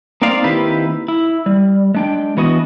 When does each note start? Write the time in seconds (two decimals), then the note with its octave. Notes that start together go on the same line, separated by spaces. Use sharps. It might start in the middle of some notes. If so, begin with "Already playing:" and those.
0.22 A#3 C4 D#4 D5 F5
0.44 D#3 A#3 C4 E4 G4 B4
1.08 E4
1.46 G3
1.95 G#3 D4 G5
2.37 E3 B3 F#4 D#5